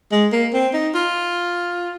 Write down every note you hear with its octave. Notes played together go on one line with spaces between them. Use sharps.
G#3
A#3
C4
D#4
F4